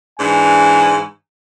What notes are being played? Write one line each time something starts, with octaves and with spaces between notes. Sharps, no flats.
G#2 E3 D4 G#5